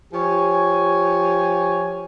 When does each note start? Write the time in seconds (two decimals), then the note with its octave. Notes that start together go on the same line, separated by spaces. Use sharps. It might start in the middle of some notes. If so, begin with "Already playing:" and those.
0.14 F3 G4 C#5 G#5